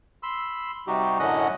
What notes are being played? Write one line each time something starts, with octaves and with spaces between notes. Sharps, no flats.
B5 C6 E6
C3 G3 D#4 F#4 G4
F#2 A2 D3 C#4 D#5 F#5